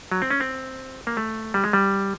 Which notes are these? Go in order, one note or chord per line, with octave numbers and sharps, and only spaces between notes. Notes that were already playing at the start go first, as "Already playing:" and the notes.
F#3
C4
C#4
C4
A#3
A3
G3
G#3
G3